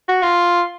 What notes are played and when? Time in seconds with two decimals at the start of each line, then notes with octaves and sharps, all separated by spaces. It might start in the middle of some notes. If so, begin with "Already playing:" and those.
0.09 F#4
0.23 F4